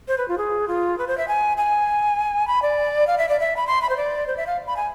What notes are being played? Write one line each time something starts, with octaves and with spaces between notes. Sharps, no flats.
C5
B4
F4
G#4
F4
B4
C5
E5
G#5
G#5
B5
D5
F5
E5
D5
E5
B5
C6
B5
C5
D5
C5
E5
F5
B5
G#5